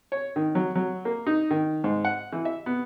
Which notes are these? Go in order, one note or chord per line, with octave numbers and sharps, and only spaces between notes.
C#5
D#3
F#3
F#3
A#3
D#4
D#3
G#2
F#5
E3
E5
B3